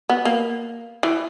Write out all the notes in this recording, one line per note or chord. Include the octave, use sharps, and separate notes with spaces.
B3
A#3
E3